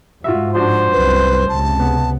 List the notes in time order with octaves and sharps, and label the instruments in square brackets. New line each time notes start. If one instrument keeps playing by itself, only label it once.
[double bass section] G#2 [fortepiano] F4 F#4 E5
[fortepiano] F3 D4 F#4 [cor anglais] C5
[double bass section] C2 F#2 [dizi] B4
[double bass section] C#2 C3 [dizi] A5
[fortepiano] B3